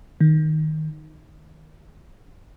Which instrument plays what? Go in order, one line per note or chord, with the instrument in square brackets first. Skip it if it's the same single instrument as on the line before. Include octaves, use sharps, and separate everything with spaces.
[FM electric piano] D#3